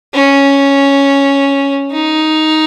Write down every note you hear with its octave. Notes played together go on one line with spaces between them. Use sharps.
C#4
D#4